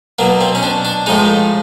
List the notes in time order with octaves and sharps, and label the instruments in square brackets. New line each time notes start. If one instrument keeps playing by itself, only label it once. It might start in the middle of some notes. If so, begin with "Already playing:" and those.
[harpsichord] B2 F#3 A#3
C4
C#4
D4
D4
A2 F3 G#3 D#4